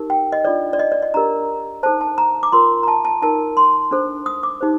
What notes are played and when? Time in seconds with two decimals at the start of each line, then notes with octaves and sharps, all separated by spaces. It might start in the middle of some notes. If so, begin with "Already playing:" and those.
Already playing: D#4 G4 A#4
0.10 G5
0.32 D#5
0.44 D4 F4 A4 D5
0.73 D5
0.79 D#5
0.92 D5
1.02 D#5
1.14 D4 G4 A#4 A#5
1.83 D#4 A4 C5 A5
2.01 A5
2.18 A#5
2.43 D6
2.52 F4 A#4 C6
2.83 A#5
2.88 A5
3.05 A5
3.22 D#4 A#4 A5
3.57 C6
3.91 D4 A4 C5
4.26 D#6
4.43 D6
4.61 D#4 G4 C5